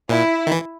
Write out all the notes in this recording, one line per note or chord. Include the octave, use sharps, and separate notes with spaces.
A#2 E4
D#3
E3